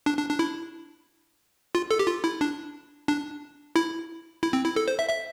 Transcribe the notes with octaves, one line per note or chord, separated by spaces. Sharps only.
D4
D4
D4
E4
F4
A4
G4
F4
E4
D4
D4
E4
E4
C4
E4
A4
C5
E5
E5